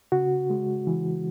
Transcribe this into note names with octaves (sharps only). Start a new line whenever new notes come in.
C#3 F#4
G#3
E3